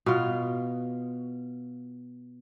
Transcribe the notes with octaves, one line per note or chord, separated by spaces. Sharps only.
B2 F4